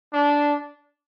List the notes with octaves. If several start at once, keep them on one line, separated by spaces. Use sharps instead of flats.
D4